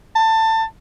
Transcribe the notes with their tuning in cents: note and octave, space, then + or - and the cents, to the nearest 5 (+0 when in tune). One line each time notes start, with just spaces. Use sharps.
A5 +20